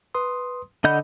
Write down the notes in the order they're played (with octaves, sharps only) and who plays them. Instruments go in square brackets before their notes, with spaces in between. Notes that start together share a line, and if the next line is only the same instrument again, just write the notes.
[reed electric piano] B4 C6 D#6
[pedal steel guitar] D3 D#5 G6 [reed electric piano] F#5 B5